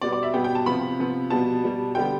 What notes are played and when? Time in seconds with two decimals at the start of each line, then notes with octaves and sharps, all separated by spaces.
0.01 B2 G3 B3 D5
0.13 D5
0.23 E5
0.34 B2 G3 B3 G5
0.44 G5
0.55 A5
0.66 C3 F3 B3 B5
0.99 C3 F3 B3
1.30 B2 G3 B3 A5
1.63 B2 G3 B3
1.95 D3 G3 B3 G5